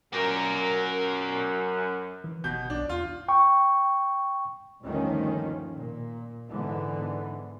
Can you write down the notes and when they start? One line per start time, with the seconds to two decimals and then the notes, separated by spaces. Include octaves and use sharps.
0.13 F#2 A#4 D5
2.24 E3
2.44 F#1 B2 G6
2.70 B1 D4
2.89 E2 F4
3.28 G5 C#6
4.82 G1 D#2 D#3 F3 A3 C#4
5.74 A#2
6.49 G#2 D3 E3 B3